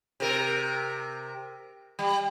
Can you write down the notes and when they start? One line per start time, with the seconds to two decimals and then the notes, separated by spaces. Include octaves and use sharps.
0.20 C3 A#4
1.99 G3